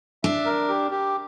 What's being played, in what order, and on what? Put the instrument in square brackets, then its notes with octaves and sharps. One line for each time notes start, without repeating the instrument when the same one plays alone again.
[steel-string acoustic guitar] D4 [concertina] E5
[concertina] A#4
G4
G4